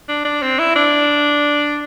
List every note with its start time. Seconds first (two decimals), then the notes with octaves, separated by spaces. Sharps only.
0.09 D4
0.25 D4
0.42 C4
0.59 E4
0.76 D4